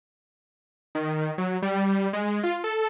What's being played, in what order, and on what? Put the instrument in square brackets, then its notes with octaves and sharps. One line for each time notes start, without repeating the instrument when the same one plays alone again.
[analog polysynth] D#3
F#3
G3
G#3
F4
A4